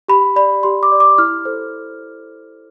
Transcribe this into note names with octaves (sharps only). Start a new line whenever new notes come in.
G4 B5
D5 B5
G4 C6
D6
D5
D6
E4 F6
A4 C5